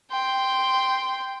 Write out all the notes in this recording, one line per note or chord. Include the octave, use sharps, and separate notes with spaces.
G5 C6